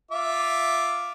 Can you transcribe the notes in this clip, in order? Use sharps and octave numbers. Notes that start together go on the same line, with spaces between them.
F4 E5 D6